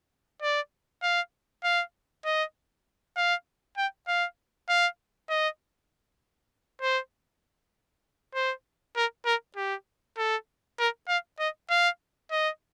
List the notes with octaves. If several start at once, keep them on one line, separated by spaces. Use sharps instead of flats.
D5
F5
F5
D#5
F5
G5
F5
F5
D#5
C5
C5
A#4
A#4
G4
A4
A#4
F5
D#5
F5
D#5